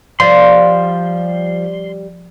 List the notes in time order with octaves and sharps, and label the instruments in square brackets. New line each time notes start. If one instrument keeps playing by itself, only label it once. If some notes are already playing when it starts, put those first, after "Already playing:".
[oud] F3 [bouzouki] G3 [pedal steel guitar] C6